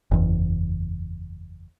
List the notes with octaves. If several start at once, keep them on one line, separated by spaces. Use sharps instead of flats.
F#1 E2